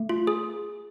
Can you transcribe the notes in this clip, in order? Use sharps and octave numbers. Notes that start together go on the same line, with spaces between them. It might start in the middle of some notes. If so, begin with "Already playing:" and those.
Already playing: A3
F4
G#4